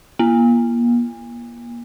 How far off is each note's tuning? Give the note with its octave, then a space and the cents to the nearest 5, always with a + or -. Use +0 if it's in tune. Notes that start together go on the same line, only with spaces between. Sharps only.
A#3 +35